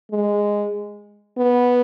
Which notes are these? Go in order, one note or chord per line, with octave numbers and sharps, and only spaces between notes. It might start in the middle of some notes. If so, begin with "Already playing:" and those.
G#3
B3